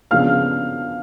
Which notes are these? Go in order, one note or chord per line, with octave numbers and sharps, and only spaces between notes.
C#3 F3 G#3 B3 D4 F5 F6